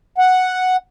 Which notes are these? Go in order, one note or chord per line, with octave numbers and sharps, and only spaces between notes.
F#5